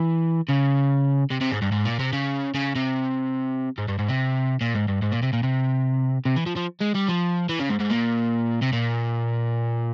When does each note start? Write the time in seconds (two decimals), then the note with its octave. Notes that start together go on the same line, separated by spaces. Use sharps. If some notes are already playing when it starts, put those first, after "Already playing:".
Already playing: E3
0.49 C#3
1.31 C3
1.41 C3
1.52 G#2
1.62 G2
1.72 G#2
1.85 A#2
1.99 C3
2.13 C#3
2.54 C#3
2.75 C3
3.78 G#2
3.88 G2
3.99 G#2
4.09 C3
4.61 A#2
4.75 G#2
4.88 G2
5.02 G#2
5.12 A#2
5.22 C3
5.33 A#2
5.43 C3
6.25 C3
6.36 E3
6.46 F3
6.56 F3
6.81 G#3
6.94 G3
7.08 F3
7.49 E3
7.60 C#3
7.70 G#2
7.80 G#2
7.90 A#2
8.62 C3
8.73 A#2